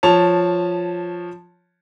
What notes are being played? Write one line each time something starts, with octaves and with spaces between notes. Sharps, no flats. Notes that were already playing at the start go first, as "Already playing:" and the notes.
F3 C#5 A5 F7